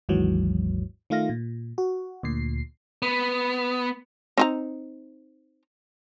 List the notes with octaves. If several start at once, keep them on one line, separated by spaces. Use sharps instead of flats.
G#1 D#2 G#2 E3 F#3
D#3 A3 F4 F5 A#6
A#2
F#4
D2 A#2 C7
B3
C4 D#4 A#5